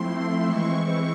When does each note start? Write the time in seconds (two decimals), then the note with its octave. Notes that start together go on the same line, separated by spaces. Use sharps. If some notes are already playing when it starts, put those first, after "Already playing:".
Already playing: F3 A3 C4 E4 C6
0.43 E3 G#3 C4 E4 C#6